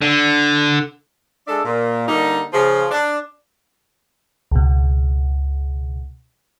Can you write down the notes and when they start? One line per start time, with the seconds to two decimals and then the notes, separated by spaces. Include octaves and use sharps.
0.01 D3
1.47 G#3 D4 A4 D5 E5
1.64 A#2
2.08 D3 G3 A#3 D#4
2.53 C#3 F3
2.91 D4
4.52 C#2 B2